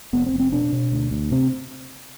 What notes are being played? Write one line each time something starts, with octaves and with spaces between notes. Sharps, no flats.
F1 B3
C4
F1
C4
B2 D4
B2
D2
D2
C3 C4